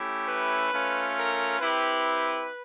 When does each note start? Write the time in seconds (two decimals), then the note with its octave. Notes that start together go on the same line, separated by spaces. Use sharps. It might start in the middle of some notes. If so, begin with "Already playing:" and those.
Already playing: A3 C#4 E4 G4
0.28 B4
0.72 A3 C#4 F4
1.17 A#4
1.60 C4 E4 G4 B4